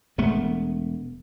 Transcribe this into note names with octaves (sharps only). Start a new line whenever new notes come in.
E1 G#3 A3 B3